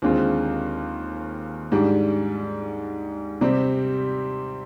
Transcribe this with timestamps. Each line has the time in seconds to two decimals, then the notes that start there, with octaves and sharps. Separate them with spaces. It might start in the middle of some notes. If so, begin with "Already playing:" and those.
0.02 D#2 D3 G#3 C4 F4
1.72 G#2 G3 D4
3.41 C3 G3 C4